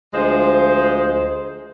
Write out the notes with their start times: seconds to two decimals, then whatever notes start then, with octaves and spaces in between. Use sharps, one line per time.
0.14 D2 F3 G#3 C5